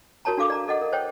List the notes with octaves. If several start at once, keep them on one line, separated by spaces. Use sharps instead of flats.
F#4 A#4 C#5 A5 A#5
D4 F#4 A4 F5 D6 D#6
D5 A#5
A4 D#5 F#5
A#4
C5 C#5 G5